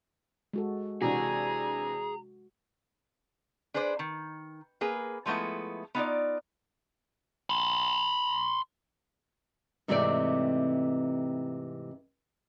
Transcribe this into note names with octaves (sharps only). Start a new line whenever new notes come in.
G#3 F#4 A4
C3 E3 D4 F#4 G#4 A#5
D4 G#4 B4 C5 D5
D#3
A#3 G#4 B4
F3 G#3 A3 B3 E4
B3 D#4 F4 D5
B5 C6
G#2 C3 E3 A3 C4 D5